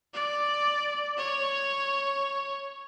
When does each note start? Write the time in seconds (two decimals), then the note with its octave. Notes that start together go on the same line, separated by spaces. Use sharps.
0.14 D5
1.18 C#5